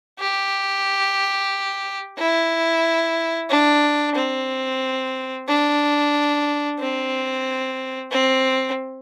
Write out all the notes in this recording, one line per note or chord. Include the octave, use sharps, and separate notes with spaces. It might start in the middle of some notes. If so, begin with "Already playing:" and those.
G4
E4
D4
C4
D4
C4
C4